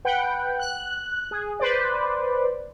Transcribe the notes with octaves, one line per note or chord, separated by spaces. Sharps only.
B4 F#5 G5
F#6
G#4
B4 C5 D5